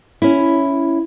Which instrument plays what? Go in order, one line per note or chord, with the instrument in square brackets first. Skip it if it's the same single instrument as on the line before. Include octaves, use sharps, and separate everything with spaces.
[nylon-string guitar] C#4 E4